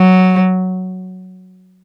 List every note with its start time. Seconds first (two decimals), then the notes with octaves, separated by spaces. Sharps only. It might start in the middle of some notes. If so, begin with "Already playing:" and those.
Already playing: F#3